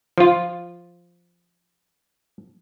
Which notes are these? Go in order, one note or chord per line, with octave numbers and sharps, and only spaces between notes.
F3 F4